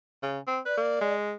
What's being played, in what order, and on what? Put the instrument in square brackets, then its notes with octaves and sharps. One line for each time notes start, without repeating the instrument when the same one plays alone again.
[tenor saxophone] C#3
C4
[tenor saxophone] B4 [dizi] D5
[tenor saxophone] A#3
G#3